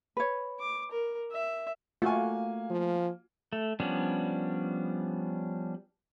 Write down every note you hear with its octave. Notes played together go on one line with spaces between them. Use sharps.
B4 C#5
D6
A#4
E5
A3 A#3 F4 F#4 G#5
F3
A3
F3 G3 B3 C#4 D4